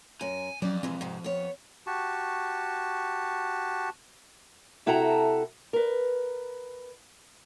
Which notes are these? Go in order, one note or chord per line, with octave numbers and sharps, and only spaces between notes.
F#2 A#4 G#5
F2 F#3 C#4 D5
C3 E3 G#3 C4
G#2 C3
B3 C#5
F#4 G4 A5 C#6
C3 E4 F#4 A4 G5 A#5
A#4 B4